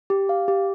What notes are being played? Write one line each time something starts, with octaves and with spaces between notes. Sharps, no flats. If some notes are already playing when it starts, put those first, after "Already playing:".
G4
F5
G4